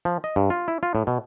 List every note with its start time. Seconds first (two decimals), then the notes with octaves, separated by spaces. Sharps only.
0.05 F3
0.24 D#5
0.36 G2
0.50 F4
0.68 E4
0.83 F4
0.95 A2
1.07 B2